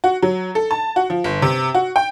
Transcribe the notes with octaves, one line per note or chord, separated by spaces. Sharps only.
F#4
F#3
A4
A5
F#4
F3
G1
C3
F#4
G5